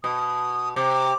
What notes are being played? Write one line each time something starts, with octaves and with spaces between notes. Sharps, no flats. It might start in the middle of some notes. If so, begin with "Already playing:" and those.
B2 D#6
C3 D6